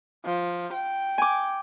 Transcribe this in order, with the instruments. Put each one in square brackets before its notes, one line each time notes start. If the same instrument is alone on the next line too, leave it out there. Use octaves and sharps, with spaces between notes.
[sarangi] F3
G5
[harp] G#5 D6